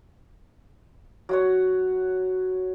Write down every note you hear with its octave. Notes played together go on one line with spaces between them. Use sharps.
F#3 F#4 C#5